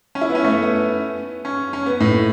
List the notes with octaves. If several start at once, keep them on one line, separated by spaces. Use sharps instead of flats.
C#4
E4
B3
C#4
A3
B3
B3
C#4
C#4
B3
A2